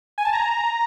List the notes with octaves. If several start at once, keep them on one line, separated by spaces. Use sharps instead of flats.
G#5
A5
A#5